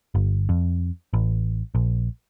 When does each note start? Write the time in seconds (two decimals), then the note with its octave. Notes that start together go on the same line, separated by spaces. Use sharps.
0.15 G1
0.49 F2
1.13 A1
1.75 A#1